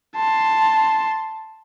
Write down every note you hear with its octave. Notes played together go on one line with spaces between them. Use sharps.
A5 C6